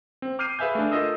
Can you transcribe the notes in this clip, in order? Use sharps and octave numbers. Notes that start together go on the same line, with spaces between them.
C4
D6 F6 G6 C7 D#7
G#4 B4 E5 F5 G#5 G6
A3 D4
F4 A4 A#4 D#5 D#6 E6